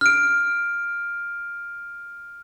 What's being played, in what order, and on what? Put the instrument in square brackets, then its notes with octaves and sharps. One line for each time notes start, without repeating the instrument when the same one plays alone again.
[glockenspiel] F6 D7